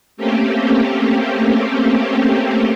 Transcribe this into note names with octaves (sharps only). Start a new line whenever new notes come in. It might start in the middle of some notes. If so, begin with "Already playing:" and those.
A3 A#3 C4 C#4 G4